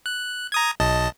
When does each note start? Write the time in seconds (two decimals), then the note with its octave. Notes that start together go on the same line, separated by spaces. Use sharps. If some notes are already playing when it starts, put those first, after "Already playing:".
0.06 F#6
0.52 A#5 D#6 G#6
0.80 B1 D#5 A5